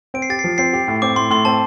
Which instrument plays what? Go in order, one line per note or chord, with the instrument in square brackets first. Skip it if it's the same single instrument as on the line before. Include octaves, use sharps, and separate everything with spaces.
[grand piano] C4 [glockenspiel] D7
[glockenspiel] C7
[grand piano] G4 [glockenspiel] A6
[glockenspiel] C7
[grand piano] F3
[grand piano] C4 [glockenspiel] C7
[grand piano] G4
A2
[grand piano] C4 [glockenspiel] D6
[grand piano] A2 [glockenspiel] C6
[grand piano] A2 [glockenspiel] C6
[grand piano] C4 [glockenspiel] A5